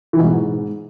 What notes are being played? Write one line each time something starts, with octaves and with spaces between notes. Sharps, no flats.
E3
B2
G#2